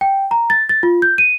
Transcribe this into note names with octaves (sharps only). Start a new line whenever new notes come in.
G5
A#5
A6
A6
F4
G6
D#7